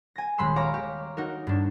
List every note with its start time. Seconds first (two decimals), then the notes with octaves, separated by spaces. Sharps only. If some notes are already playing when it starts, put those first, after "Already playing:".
0.16 G#5 A#6
0.38 D#1 G#3 B5 C6 E6
0.56 C#5 F5 A#5 D6
0.74 G4
1.17 D#4 F#4 A#4
1.47 G2 D4